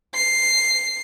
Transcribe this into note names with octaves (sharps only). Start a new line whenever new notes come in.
C7